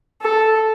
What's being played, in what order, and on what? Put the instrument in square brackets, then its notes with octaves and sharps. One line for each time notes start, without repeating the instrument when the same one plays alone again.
[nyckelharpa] A4